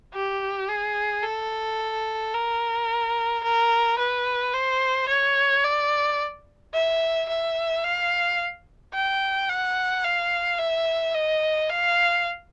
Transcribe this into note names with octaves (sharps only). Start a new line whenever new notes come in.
G4
G#4
A4
A#4
A#4
B4
C5
C#5
D5
E5
E5
F5
G5
F#5
F5
E5
D#5
F5